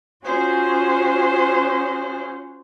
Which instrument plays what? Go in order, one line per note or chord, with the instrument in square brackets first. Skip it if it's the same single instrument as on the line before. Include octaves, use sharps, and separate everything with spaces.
[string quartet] C#4 F4 F#4 G#4 C5